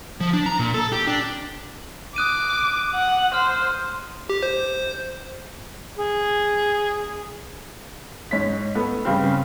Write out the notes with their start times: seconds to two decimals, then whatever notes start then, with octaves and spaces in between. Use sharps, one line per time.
0.20 F3
0.33 D4
0.46 A#5
0.59 A#2
0.74 A4
0.92 G4
1.07 D4
2.16 D6 D#6 F#6 D#7
2.95 F#5
3.34 C5 F6
4.30 G4
4.43 C5
5.98 G#4
8.31 G#2 C#5 B6
8.75 A3 B3
9.05 G2 C#3 C4